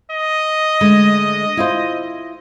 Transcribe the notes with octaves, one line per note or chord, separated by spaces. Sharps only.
D#5
D3 G#3 A3
E4 F4 C5